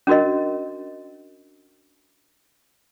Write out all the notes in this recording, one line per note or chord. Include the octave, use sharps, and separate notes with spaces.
C#4 D4 F#4 A#4 D#5